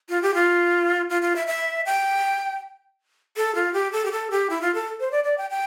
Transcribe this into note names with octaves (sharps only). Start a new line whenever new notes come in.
F4
G4
F4
F4
F4
E5
E5
G5
A4
F4
G4
A4
G4
A4
G4
E4
F4
A4
C5
D5
D5
G5
G5